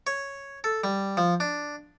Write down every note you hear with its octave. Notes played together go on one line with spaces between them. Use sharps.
C#5
A4
G3
F3
D4